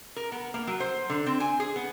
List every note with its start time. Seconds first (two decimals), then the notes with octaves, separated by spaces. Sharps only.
0.16 A#4
0.32 B3
0.54 A#3
0.67 F#3
0.80 C5
1.10 D3
1.26 C4
1.40 G#5
1.60 G#4
1.76 B3